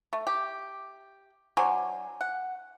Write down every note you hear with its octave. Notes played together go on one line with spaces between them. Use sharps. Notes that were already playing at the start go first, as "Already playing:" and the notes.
A3
G4
F#3 D4 C5 G#5
F#5